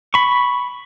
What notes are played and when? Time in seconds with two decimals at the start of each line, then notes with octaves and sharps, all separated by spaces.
0.14 B5 C#6